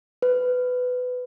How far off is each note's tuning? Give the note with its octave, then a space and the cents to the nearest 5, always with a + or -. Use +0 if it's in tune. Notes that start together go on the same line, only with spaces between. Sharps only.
B4 +15